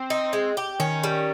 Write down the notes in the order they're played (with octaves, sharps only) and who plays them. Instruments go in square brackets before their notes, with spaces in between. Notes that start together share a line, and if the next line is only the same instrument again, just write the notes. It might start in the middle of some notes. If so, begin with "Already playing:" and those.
Already playing: [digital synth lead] C4
[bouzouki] D#4
G#3
G4
[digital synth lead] D#3 [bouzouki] C#4
[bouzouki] G3